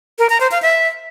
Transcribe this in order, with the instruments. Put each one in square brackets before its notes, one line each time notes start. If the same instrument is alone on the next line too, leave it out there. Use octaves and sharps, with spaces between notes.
[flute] A#4
A#5
C5
F5
E5